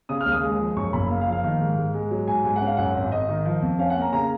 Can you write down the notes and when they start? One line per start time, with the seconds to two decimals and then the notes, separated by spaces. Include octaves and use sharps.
0.09 C#3 D#6
0.21 F6
0.26 D#2
0.32 D#6
0.43 G#3
0.60 F3
0.76 F#2 C#6
0.93 F#1 B5
1.10 A#3 F5
1.21 F5
1.27 F3
1.32 F5
1.44 D#3
1.61 G#2
1.77 G#2
1.94 G#3
2.11 F#3
2.28 G#2 G#5
2.44 G#2 G#5
2.56 F#5
2.61 C#4 F5
2.77 F#2 F#5
2.95 G#1
3.12 G#1 D#5
3.29 D#3
3.45 F3
3.62 F2
3.79 C#4 F5
3.90 F#5
3.96 A#3
4.02 A#5
4.13 C#3 A#5